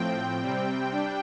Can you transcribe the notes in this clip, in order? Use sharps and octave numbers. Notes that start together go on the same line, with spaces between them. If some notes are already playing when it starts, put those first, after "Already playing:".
Already playing: A2 F3 C4 G5
C3 G3 C4
G3 D4